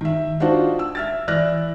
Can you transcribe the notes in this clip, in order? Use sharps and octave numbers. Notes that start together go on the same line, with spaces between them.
D#3 E5
D4 D#4 F4 F#4 C5
E6
E5 F6 A6
E3 D5 E5 F6 F#6 A#6